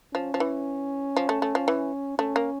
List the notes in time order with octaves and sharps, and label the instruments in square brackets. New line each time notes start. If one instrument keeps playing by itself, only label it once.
[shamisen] F3 [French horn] C#4
[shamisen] F3
E3
F3
A3
A3
F3
E3
[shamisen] A3 [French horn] C#4
[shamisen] A#3